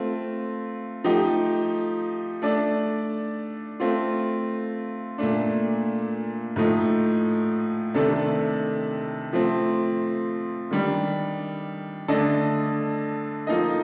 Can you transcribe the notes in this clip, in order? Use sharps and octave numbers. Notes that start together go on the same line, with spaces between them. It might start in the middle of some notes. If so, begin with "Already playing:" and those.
Already playing: A3 C4 F4
F3 A3 D#4 G4
A3 D4 A4 D5
A3 C4 F4
A#2 A3 D4
A2 F3 A3 D#4
C3 D#3 A3 D4 A4
F3 A3 C4
D#3 G3 D4
D3 A3 D4 A4 D#5
F3 A#3 D#4 A4 D#5